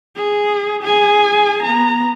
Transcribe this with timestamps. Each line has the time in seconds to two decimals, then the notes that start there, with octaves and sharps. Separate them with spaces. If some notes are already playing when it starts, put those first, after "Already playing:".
0.16 G#4
0.84 G#4 G#5
1.63 B3 A#5